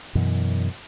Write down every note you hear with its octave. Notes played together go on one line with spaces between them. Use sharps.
F#2 B2 E3